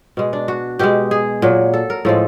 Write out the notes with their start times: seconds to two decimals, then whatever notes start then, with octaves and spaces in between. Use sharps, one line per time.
0.17 B2 G#3
0.33 D4
0.48 F#4
0.79 B2 G#3 G4
1.11 G#4
1.42 A#2 F#3
1.74 A4
1.90 A#4
2.05 A2 F3 G#3 A4